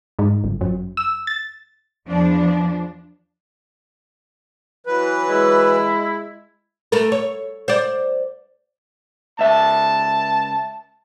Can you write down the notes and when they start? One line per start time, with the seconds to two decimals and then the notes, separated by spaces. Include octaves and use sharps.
0.19 G#2
0.44 G1
0.61 F#2
0.97 E6
1.27 A6
2.07 E2 F3 D4
4.87 E3 F#3 B4
5.29 G#3 E4
6.92 A3 A4 A#4
7.12 C#5
7.68 C5 D5
9.39 C#2 E5 A5